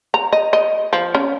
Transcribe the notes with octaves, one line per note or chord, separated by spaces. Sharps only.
A#5
D#5
D#5
F3
C#4